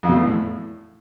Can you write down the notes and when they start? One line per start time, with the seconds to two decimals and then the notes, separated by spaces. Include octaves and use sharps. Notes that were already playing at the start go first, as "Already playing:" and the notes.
0.03 F2
0.09 B2
0.15 A3
0.21 E2
0.27 A2